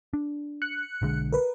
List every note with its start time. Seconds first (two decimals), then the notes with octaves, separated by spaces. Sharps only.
0.13 D4
0.62 F#6 C#7
1.02 B1 D3 G#3
1.32 A#4 B4